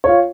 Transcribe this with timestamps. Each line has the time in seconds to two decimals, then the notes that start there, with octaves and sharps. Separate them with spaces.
0.04 C#5
0.06 F4
0.09 F5